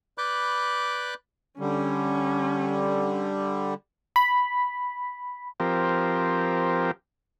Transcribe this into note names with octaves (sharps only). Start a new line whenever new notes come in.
B4 D5 B5 D6 F#6 G6
D3 G3 C#4
B5
F3 C4 G4 A#4